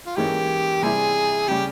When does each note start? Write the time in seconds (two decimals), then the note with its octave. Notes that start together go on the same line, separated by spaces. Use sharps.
0.06 F4
0.16 G#2 E3 A#3 C#4 G4
0.82 C3 G3 C4 E4 G#4
1.48 C#3 G3 C#4 G4